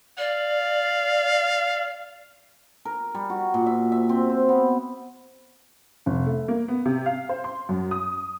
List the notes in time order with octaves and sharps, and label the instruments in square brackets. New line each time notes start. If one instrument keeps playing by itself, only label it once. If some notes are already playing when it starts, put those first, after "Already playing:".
[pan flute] D5 [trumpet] F5
[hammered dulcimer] A#4
G3
F#4
A#2
E5
E5
C4
C5
B3
[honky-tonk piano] F1
A3
A#3
B3
C3
F5
C5
C6
F#2
D#6